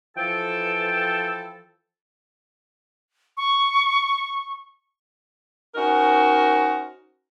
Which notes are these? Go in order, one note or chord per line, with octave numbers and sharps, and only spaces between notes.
E3 F3 A4 G5
C#6
C#4 D#4 F#4 A#4 C5